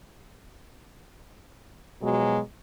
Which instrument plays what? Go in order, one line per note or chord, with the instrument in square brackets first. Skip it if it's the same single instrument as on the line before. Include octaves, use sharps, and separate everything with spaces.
[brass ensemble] B2 F3 F#3 G#3